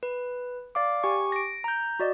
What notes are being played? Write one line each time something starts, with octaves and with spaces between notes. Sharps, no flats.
B4
D5 F5 D6
G4 G#5 C#6
A#6 D7
A#5 G6
F#4 D5 D#5